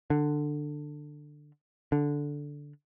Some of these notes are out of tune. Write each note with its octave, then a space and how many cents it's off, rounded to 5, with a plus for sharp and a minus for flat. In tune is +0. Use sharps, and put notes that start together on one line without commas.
D3 +15
D3 -10